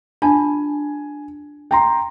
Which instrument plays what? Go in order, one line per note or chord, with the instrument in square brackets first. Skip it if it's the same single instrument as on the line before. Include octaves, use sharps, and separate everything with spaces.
[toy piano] D4 F4 A5 [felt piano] G#5
[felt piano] G5 A#5 C6